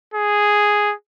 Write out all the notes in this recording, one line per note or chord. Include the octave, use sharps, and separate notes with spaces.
G#4